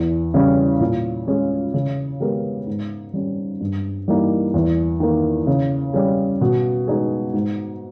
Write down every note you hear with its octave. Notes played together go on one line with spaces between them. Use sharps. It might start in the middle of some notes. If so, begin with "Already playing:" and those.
Already playing: E2
C#3 G3 C#4
A#2
G#3 C#4 G#4
C#3
G#3 B3 G4 A#4
G#2
G3 C#4
G2
E3 G3 A#3 D#4
E2
D#3 A#3
C#3
G3 C#4 G#4
B2
G#3 B3 D#4 G#4
G#2